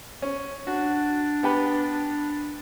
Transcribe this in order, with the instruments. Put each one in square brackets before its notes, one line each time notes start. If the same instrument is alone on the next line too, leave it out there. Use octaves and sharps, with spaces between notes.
[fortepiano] C#4
[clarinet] D4 [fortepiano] F#4
[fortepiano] B3 G4 B4